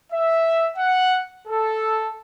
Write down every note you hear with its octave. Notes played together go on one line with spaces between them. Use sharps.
E5
F#5
A4